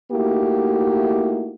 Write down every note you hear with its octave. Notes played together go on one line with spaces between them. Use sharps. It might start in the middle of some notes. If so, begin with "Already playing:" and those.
A3 A#3 D#4 E4 F#4 G4